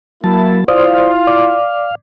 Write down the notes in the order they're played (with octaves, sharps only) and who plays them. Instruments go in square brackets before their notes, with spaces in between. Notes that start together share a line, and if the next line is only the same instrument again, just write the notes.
[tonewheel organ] F#3 A5 [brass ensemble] A#3 E4
[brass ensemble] E4 F4 [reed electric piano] C5 D5 D#6 [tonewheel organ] F5
[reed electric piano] D5 D6